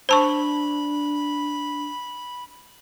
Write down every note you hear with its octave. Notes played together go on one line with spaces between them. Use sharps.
D4 C5 A5 B5 C#6